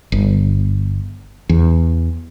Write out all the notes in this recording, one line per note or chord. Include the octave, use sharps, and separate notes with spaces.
G1
E2